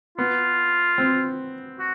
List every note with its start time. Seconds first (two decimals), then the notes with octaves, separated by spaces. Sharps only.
0.18 B3 F4
0.98 C4
1.79 F#4